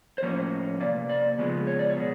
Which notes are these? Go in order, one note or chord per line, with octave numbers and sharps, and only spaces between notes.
C5
A2 F3 A#3 C#4 C#5
C3 F3 A#3 D5
D5
C#3 F3 G#3 B3
C#5
D5
C#5
B2 G#3